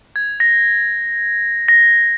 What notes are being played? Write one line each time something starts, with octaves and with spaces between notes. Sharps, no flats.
G#6
A#6
A#6